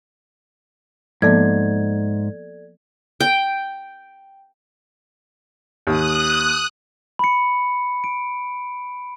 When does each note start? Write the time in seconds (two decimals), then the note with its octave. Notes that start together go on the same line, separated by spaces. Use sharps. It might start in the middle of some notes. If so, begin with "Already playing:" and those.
1.22 G#2 F3 A#3 B3 A4 D5 G#6
3.20 G5
5.87 D#2 D#6 F#6
7.19 B5 C#7
8.04 D7